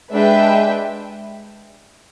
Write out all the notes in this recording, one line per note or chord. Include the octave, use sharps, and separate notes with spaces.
G#3 D4 G4 B4 E5 G5